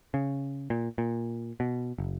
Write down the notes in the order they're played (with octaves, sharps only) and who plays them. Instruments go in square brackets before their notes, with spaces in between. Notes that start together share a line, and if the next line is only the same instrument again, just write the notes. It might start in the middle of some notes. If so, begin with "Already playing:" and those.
[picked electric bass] C#3
A#2
A#2
B2
F#1